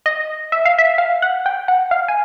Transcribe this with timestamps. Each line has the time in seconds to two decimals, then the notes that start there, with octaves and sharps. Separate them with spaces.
0.06 D#5
0.52 E5
0.65 F5
0.78 E5
0.98 F5
1.22 F#5
1.46 G5
1.68 F#5
1.91 F5
2.08 G#5